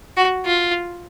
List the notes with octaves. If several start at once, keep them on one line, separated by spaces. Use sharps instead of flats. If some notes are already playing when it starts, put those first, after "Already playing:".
F#4
F4